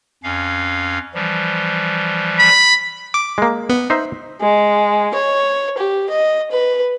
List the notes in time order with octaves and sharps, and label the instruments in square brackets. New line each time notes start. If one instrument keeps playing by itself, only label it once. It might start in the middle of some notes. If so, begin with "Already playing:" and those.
[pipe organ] F2 C#4 F5
E3 F3 G3
[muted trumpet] B5
[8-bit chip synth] D6
[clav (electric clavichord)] G#3 A#3
[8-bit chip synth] B3
[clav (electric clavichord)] D#4 C5 E5
[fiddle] G#3
C#5
G4
D#5
B4